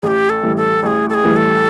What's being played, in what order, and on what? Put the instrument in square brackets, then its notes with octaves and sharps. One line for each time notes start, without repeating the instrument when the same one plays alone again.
[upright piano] A1 [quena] G4 G#4
[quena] A4
[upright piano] A2 E3 G3
[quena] A4
[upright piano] A1 [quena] G#4 A4
[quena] A4
G#4
[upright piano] A2 E3 G3
[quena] A4